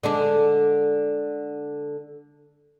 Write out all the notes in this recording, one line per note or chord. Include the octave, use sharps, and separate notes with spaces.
D3 G#3 D4